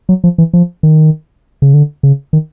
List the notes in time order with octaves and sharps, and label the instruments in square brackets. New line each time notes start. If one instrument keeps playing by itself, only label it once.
[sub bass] F#3
F3
E3
F3
D#3
C#3
D3
C#3
D#3